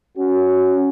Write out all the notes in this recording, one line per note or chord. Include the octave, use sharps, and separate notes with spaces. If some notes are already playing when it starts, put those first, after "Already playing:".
C#4 F#4